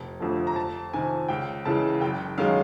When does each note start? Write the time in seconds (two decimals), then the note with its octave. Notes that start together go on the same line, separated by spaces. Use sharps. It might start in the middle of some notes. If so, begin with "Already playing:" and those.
Already playing: F1
0.20 F2 D3 F3 A3
0.47 A#5
0.56 F2 A5
0.93 C3 D#3 G#5
1.28 C#2 G5
1.65 C#3 E3 G#3 A5
2.01 F#1 G5
2.38 F#2 D#3 G#3 F5